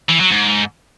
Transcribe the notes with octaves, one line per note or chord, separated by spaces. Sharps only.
E3
F#3
G#2